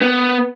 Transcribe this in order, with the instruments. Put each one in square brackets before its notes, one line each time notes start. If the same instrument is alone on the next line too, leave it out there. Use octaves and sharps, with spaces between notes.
[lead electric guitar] B3